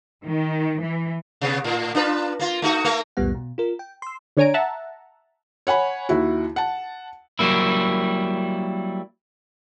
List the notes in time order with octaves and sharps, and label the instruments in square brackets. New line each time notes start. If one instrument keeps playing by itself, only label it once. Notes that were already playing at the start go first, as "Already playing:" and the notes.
[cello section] D#3
E3
[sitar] C3 B3
A2
D4 F4 B4
A#3 F4
A3 D#4 F#4
A3 A#3 A#4
[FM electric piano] B1 E2 A2 G3 B3 F#5
B2
F4 A#4
G5
C6 E6
[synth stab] D3 D4 C#5 G#5 A#5 D7
E5 F#5 A5 A#5
[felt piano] C#5 F#5 G#5 B5
D#2 E4 F#4
F#5 A5
[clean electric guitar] F#3 G3 A#3 E4